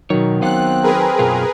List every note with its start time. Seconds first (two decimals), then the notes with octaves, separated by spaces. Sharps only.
0.10 B2 D#3 F#3 C#5
0.42 B3 C4 F5 F#5 F#6
0.83 G#4 A#4 B4
1.19 F#2 B2 F4